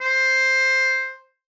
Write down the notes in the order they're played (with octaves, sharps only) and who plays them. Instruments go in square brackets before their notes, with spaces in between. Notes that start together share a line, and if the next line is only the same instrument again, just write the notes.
[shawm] C5